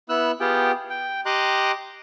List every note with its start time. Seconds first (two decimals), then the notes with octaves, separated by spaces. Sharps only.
0.09 B3 E4 E6 F#6
0.40 B3 F4 G4 G#4 G5
0.90 G5
1.26 G4 D#5 A#5 C6 D6 F#6